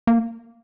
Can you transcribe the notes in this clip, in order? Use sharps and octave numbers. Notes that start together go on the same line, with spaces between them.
A#3